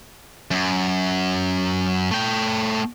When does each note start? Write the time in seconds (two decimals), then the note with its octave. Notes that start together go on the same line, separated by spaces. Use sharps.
0.51 F#2
2.11 A3 G5